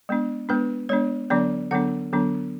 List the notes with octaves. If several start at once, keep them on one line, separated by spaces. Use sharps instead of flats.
G#3 B3 D4
G#3 B3 D4 B4
G#3 B3 D4 C#5
D3 F#3 B3 D4 D5
D3 F#3 B3 D4 F#5
D3 F#3 B3 D4